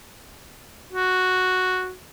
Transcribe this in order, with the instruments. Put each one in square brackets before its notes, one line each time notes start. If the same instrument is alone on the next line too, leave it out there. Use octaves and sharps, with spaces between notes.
[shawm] F#4